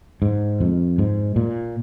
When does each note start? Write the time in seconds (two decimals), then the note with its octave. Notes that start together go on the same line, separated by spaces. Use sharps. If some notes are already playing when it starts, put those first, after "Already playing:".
0.22 G#2
0.60 F2
0.98 G#2
1.36 A#2